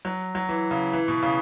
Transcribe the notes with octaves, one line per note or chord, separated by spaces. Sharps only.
F#3
F#3
E3
C#3
E3
B2
C#3